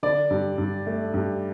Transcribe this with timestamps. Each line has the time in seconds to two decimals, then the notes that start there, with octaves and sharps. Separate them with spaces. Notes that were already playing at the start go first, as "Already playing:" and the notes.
0.03 D3 D5
0.30 G2
0.58 G2
0.87 A3
1.14 G2